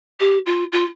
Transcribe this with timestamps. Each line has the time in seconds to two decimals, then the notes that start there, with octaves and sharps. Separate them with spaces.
0.19 G4
0.46 F4
0.72 F4